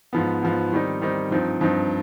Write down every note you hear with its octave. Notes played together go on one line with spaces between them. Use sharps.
G#2 F3 B3
G#2 F3 B3
D#3 G3 C4 D#4
D#3 G3 C4 D#4
G2 F3 C4 D#4
G2 F3 C4 D#4